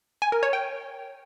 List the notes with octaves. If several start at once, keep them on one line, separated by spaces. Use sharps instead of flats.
G#5
A#4
C#5
G5